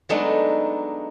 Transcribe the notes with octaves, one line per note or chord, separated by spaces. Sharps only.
F#3 G#3 A3 B3 D4 D#4